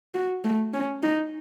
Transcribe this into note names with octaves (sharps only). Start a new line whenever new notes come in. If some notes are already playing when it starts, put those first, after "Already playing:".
F#4
A3
C#4
D#4